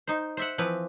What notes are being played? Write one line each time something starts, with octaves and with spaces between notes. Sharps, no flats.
D#4 C5
C5 E5 F#5
E3 F3 C4 B4